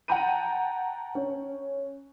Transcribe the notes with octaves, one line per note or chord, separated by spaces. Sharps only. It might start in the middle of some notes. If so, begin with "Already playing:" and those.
F#5 G5 A5 A#5 G6 D#7
C#4